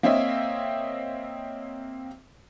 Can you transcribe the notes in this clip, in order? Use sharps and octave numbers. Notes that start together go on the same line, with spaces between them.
A#3 C4 C#5 D#5 E5